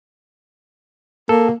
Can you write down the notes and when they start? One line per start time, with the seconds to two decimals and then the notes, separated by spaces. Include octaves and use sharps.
1.29 A#3 A4